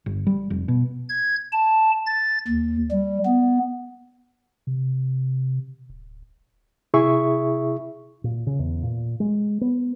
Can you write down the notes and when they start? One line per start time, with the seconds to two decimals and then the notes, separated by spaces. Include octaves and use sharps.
0.06 G1
0.26 G3
0.50 F1
0.68 B2
1.09 G#6
1.52 A5
2.06 A6
2.48 D#2
2.91 G3
3.26 B3
4.67 C3
5.90 D1
6.94 C3 E4 G#4 E5 C#6
8.24 A#2
8.47 C#3
8.59 E2
8.83 A#2
9.20 G#3
9.61 B3